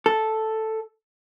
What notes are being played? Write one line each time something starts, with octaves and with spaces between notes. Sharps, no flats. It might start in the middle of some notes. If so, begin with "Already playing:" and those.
A4